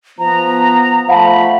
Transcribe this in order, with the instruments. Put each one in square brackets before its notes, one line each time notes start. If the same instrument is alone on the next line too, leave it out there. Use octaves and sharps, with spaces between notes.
[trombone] F3 [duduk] B3 [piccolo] A#5
[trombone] F3 [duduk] A3 [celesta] F5 F#5 A5 [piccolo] B5